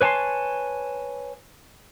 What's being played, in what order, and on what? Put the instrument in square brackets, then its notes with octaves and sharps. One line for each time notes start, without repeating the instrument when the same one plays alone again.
[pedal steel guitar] B4 C#5 G#5 A5 C6